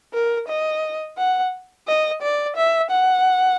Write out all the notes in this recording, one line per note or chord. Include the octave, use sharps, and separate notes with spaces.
A#4
D#5
F#5
D#5
D5
E5
F#5